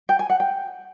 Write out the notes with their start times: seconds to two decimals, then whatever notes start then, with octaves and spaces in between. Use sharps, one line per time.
0.09 G5
0.19 G#5
0.30 F#5
0.40 G5